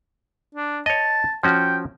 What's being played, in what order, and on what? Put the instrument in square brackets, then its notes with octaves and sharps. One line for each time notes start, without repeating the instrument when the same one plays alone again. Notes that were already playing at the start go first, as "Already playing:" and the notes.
[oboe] D4
[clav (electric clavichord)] C#5 D#5 [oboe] A5
[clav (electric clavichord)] F3 C#4 F#4 [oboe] G5